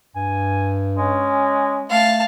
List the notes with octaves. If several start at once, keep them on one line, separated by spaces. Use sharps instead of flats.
G2 G#5
G#3 C#4
A3 F5 A5